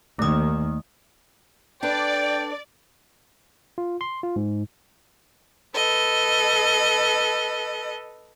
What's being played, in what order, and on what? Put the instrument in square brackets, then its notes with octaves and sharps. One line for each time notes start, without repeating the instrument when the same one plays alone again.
[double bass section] D#2 D#3 [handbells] A3 D#6
[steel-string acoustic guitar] D4 A4 B4 [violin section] D5 [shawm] G5
[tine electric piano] F4
C6
F4
G#2
[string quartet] A4 B4 D#5